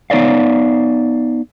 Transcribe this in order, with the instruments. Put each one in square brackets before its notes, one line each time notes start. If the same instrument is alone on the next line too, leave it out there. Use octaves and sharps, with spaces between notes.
[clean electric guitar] B3 D#4 C#5 D5 F5